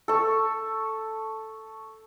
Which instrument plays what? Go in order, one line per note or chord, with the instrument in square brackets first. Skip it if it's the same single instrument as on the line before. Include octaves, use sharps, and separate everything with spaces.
[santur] A4 C#6